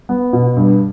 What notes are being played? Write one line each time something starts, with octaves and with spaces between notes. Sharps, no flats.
B3
B2
G2